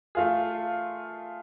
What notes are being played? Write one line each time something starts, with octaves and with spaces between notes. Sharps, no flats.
A3 F4 G#4